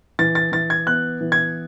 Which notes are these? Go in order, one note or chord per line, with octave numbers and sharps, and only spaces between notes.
E3 A6
A6
E3 A6
G#6
B3 F#6
E3
G#6